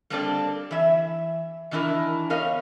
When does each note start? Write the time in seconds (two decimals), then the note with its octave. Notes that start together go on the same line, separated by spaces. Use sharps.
0.10 G3 A#3 C4 D4 A4 D5
0.71 E3 E5
1.71 D#3 E3 D4 E4 A#4
2.30 B3 C#4 A#4 D#5 F5